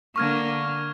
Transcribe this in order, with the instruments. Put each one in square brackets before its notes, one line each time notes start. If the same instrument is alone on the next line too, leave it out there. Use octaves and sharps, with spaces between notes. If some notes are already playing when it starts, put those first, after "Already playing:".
[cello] D3 A#3 [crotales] C#6 F6 G#6